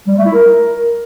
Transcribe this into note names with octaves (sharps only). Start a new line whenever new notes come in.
G3
A3
E4
A#4